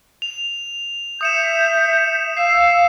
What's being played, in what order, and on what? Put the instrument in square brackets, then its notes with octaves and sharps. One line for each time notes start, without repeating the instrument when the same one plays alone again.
[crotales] F7
[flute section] E5 G6 [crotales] D#6 C#7 E7
[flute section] F5 E6 [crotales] C7 E7